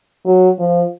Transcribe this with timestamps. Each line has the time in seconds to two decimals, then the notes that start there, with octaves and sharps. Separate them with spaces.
0.25 F#3
0.58 F3